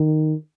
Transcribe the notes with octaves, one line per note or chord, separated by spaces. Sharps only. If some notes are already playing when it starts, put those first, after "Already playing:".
Already playing: D#3